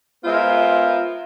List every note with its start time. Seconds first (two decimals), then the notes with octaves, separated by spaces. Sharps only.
0.24 G#3 B3 F4 A#4 C5 E5